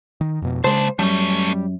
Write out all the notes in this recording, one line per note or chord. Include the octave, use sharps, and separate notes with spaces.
D#3
F2 B2
C#3 G#3 A#3 C5 A5
F#2 G3 A3 C#4